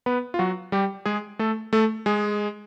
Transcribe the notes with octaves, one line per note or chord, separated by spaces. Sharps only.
B3 B4
F4
F#3 F#4
G3 G4
G#3 G#4
A3 A4
A3 A4
G#3 G#4